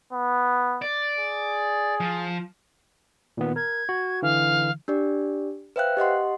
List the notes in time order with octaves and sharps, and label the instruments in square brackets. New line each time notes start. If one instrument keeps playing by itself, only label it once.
[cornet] B3
[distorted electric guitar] D5
[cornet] G#4
[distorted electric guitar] F3
[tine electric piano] A#2 D#3 B3
[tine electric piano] A#4 [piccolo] G#6
[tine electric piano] F#4
[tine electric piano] D3 E3 [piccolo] F5
[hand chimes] D4 G4 D5
B4 C5 E5 F5 G5 F#6
G4 D#5 F#5 C6